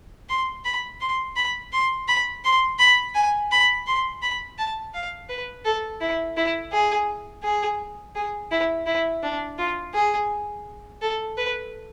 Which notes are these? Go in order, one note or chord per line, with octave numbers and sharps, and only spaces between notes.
C6
B5
C6
B5
C6
B5
C6
B5
G#5
B5
C6
B5
A5
F5
B4
A4
E4
E4
G#4
G#4
G#4
E4
E4
D4
F4
G#4
A4
B4